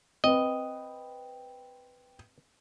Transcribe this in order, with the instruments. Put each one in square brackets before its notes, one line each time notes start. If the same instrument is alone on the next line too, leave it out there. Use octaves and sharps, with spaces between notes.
[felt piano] C4 B4 [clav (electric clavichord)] D#5